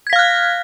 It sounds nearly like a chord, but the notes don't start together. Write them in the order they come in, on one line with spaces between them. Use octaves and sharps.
G#6 B6 F5 F6 F#6